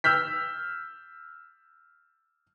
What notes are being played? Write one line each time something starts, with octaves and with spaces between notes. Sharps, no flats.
E6 F6 G6 B6